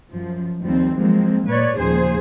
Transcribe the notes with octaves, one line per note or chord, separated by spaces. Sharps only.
F#2 F3
D#2 F3 G3 C4
F3 F#3 G#3 A#3 C4
A#2 B4 C#5 D5
D#2 A#2 C#3 F3 G#4 C5